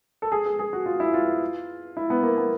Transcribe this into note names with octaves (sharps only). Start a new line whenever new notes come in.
A4
G#4
G#4
G#4
F#4
F4
E4
F4
E4
B3
A#3
B3